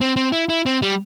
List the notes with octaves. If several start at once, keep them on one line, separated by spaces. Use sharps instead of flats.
C4
C4
E4
E4
C4
G3